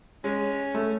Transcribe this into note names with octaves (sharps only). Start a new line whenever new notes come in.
G#3 C#4
A3